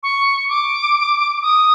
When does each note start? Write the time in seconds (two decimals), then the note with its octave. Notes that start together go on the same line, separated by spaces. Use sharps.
0.03 C#6
0.49 D6
1.42 D#6